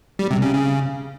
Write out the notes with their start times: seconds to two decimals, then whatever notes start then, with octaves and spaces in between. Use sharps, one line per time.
0.19 G3
0.31 C3
0.42 C#3
0.53 C#3